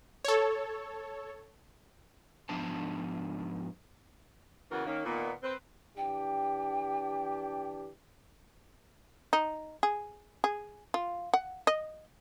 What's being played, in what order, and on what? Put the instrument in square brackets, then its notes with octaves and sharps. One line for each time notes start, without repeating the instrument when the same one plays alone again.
[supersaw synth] A4 C#5
[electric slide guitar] G#2 F3 B3 D4 C5 A5
[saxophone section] C#3 E3 A#3 B3 F#4 A#4
D#3 A#3 C#4
A#2 D#3 B3
C4 B4 C5
[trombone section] E3 D4 G4 [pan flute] G5
[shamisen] D#4
G#4
G#4
F4
F#5
D#5